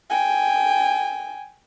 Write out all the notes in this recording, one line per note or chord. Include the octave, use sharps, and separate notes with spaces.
G5 G#5